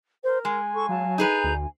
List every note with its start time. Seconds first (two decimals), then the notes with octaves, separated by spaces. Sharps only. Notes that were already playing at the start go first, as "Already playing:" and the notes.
0.24 A#4 C5
0.45 G#3 G#5
0.74 A4 C#6
0.89 F#3 F5 A5
1.18 D#4 G#4 B4 A#5 G6
1.44 D2